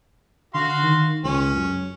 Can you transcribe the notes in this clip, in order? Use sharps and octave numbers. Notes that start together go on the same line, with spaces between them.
D3 F#4 F5 C6
D#3
C#2 C#4
F#2